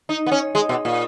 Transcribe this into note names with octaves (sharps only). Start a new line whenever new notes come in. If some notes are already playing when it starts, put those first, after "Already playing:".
D#4
B3
C#4
G#3
B2
A#2